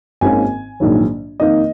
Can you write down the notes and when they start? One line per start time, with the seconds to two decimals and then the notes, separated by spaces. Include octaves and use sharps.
0.21 G#1 G#2 D#3 A#3 C#4 G#5
0.80 A#1 G#2 D#3 F#3
1.40 F2 D#3 A#3 D#4 D#5